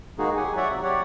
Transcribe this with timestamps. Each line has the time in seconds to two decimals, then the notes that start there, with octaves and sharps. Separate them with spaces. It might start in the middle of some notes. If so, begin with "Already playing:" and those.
0.18 D#3 G#3 A#3 D#4 F#4 G#4
0.37 F#3 G4 F#5 G#5
0.57 C#5 D5 E5 F#5
0.69 C3 F#3
0.83 G4 C#5 D5 F#5